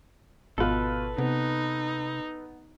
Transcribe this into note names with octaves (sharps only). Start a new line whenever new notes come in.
G#1 B2 F4 A4 B4
C3 B3 D#4